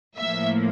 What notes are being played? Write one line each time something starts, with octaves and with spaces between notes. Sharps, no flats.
A2 F3 A#3 E5